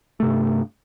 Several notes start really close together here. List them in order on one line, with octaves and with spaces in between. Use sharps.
A3 C3 G2